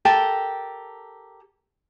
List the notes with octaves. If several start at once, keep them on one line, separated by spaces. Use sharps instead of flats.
G4 A4 A#4 G5